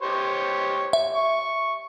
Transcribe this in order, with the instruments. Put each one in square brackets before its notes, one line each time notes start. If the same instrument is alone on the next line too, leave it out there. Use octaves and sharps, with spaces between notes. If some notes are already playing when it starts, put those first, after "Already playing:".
[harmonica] G4 C5 C#5
[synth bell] E5
[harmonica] C#6